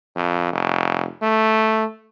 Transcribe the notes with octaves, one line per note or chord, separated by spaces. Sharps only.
F2
F1
A3